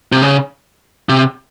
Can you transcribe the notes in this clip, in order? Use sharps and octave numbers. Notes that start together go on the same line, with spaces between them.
C3
C#3
C3